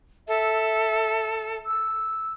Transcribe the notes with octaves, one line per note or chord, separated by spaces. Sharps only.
A4 E5
E6